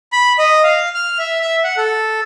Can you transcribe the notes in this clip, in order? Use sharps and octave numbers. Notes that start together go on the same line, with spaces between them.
B5
D#5
F5
F6
E5
E5
F#5
A4